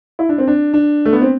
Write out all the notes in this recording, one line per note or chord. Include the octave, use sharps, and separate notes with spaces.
E4
D4
C4
D4
D4
A3
B3
C4